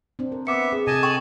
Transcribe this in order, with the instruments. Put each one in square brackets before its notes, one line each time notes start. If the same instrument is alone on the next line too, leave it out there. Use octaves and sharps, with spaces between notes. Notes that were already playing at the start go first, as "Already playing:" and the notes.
[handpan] C4 D4
A#4
[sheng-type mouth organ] B3 E5 [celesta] D6 C#7
[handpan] C4 [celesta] G#4
[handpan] C3 A4 [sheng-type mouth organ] D#5 G#5 A5
[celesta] G5 [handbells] C#6